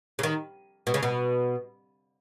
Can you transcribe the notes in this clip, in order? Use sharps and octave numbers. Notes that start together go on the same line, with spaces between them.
C#3
D#3
B2
C#3
B2